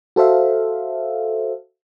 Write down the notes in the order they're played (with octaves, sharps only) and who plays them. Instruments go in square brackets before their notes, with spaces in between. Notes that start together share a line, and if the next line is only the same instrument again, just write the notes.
[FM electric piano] F#4 A4 C5 E5 F5